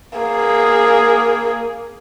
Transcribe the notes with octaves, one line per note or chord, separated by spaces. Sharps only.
A#3 G#4